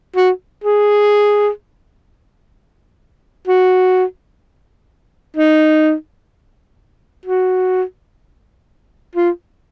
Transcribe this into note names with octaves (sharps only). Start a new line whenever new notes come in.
F#4
G#4
F#4
D#4
F#4
F4